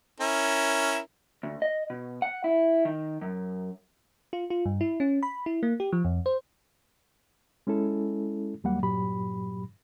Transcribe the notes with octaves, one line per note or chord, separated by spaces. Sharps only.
C#4 E4 A#4
D2
D#5
B2
F#5
E4
D#3
F#2
F4
F4
G2
E4
C#4
B5
E4
A#3
G4
F3
F2
C5
G#3 C#4 E4 A4
D#2 F#3 G3 A#3 F#5
G2 A#2 F#3 G4 B5